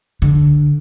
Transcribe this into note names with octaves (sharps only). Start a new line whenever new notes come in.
D3